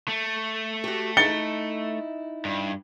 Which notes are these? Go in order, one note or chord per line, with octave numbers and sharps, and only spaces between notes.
A3
F#4 G4
D#4 E4 A6 C#7 G7
G2